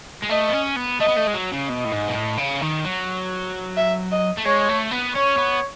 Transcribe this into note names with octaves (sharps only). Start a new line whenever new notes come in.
G#3
A3 D#5
B3
C#4
B3
A3 D#5
B3
A3
G#3
F#3
C#3
B2 D#5
A2
G#2
B2
A2
C#3
D#3
F#3
E5
D#5
A3
G#3 C#5
A3
B3
C#4 C#5
B3